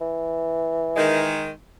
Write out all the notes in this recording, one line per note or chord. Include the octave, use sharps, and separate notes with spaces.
E3
D#3 G#3